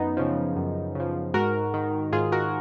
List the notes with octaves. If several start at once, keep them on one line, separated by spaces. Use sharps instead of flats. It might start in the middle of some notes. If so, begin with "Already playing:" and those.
Already playing: F#2 B3 D#4
C#3 F3
F#2
C#3 F3
G#2 F#4 A#4
D#3
G#2 F4 G#4
F#4 A#4